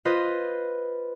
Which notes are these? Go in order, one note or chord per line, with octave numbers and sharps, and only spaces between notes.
F4 B4 C5 D#5